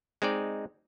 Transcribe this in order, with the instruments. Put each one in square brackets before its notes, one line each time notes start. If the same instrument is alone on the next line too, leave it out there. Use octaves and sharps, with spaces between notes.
[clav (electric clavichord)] G#3 C4 D#4 D5